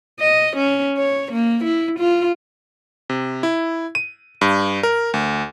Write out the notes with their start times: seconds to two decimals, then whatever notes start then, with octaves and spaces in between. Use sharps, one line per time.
0.20 D#5
0.57 C#4
0.98 C#5
1.32 A#3
1.64 E4
1.99 F4
3.10 C3
3.43 E4
3.95 D#7
4.41 G2
4.83 A#4
5.14 D2